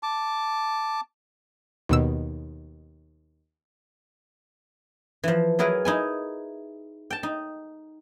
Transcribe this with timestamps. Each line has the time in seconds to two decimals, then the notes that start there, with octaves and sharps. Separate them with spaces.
0.03 A5 D6
1.89 D#2 B2 E6
5.24 E3 F3
5.59 F#3 E4 G#4 A#4 B4
5.85 D#4 E4 G#5
7.10 G5 A5
7.23 D#4